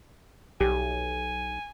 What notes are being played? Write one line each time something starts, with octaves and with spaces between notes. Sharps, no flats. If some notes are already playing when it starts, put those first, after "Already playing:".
B1 G4 G#5